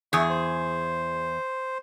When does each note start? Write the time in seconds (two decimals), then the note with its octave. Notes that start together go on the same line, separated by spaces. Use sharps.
0.13 E2 G#4 E5 C#6
0.30 C5